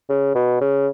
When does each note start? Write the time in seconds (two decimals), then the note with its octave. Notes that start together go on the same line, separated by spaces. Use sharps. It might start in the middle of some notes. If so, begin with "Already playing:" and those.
0.09 C#3
0.35 B2
0.61 C#3